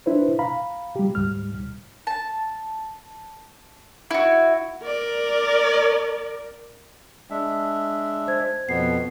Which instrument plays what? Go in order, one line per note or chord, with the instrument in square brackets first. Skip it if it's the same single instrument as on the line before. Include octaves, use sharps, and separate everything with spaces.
[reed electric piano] D4 E4 B4 C5
F5 A#5 B5
G3 G4
D2 G#2 G3 F6
[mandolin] A5
E4 F#4
[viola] A#4 D5
[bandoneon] G#3 D4 E5
[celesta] C5 G#6
[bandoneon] F2 B2 B3 [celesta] C7